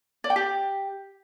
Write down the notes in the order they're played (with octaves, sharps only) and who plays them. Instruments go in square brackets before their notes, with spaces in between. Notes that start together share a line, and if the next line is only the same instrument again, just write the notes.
[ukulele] D5
G5
G4